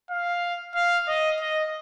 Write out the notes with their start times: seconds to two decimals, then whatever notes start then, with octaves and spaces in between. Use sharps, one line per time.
0.10 F5
0.75 F5
1.08 D#5
1.41 D#5